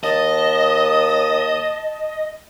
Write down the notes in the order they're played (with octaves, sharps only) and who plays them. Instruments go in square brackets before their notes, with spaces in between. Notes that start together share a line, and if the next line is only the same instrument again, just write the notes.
[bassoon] D#2 [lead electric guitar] D#5 [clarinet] A5 [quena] D#6